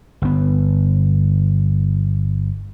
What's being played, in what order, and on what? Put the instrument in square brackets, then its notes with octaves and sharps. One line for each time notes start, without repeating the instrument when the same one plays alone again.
[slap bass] G1 B3